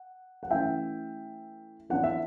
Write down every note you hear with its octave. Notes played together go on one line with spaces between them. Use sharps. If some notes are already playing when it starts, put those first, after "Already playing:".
Already playing: F#5
F#5
E3 A3 C#4 E5 G5
E3 B3 D4 F#5
E5